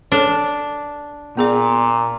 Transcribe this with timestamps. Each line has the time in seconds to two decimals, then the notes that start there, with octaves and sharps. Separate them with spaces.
0.12 D4 A4 C#5
1.37 A#2 B3 G#4 D5